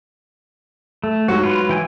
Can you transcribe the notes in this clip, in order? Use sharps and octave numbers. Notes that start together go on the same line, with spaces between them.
A3
G#2 F#3 F#4
F4 B4
E3 G5 G#5